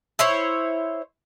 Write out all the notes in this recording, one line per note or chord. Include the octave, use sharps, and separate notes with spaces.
E4 C5 C#5